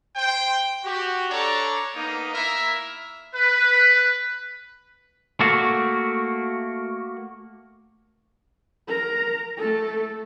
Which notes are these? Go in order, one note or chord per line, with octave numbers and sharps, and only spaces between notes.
C5 G5
F#4 G4
D4 A4 C#5 D5 A#5
A#3 B3 D#4
A#3 E4 A#4 E5
B4
A3 A#3 F#4
A#4 A#5
A3 A4